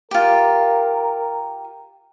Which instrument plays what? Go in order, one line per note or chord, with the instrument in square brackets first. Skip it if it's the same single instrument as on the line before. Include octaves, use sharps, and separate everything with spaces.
[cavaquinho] F4 G4 [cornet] A#4